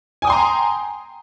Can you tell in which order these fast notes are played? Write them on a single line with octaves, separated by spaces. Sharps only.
G#5 D#6 G5 C6 A#5